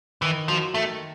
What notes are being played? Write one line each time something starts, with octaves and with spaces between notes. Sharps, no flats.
D#3 E3
F3 F#3
D#3 A3